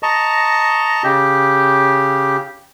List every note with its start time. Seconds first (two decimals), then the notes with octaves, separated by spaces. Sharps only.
0.03 D#5 A5 A#5 C#6
1.04 C#3 G4